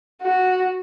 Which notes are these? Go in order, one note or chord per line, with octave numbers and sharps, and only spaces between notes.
F#4